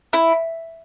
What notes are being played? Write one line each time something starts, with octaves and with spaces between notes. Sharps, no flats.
E4